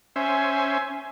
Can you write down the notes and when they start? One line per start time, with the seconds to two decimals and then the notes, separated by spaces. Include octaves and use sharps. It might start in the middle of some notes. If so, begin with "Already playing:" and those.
0.16 C#4 C5 E5 G#5